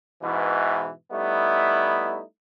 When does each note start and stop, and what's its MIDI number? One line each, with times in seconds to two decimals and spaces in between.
0.23 0.91 44
0.23 0.91 47
0.23 0.91 52
1.13 2.21 55
1.13 2.21 57
1.13 2.21 59
1.13 2.21 63
1.13 2.21 64